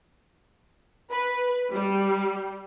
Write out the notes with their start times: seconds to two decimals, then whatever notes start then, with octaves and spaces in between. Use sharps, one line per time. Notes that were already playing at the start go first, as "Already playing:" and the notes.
1.12 B4
1.72 G3